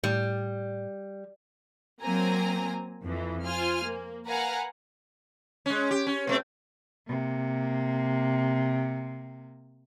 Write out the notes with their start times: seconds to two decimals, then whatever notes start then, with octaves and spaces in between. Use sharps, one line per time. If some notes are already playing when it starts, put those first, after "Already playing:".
0.04 A2 G3
2.02 F#3 A#3 C4 G#5 A#5
3.03 F2 E3
3.46 F4 C5 G#5 F6
3.86 A#3
4.27 A#4 B4 F5 F#5 G#5 A#5
5.66 G#3 C#4
5.91 G4
6.07 C#4
6.27 B2 A3 C4
7.08 C3 A#3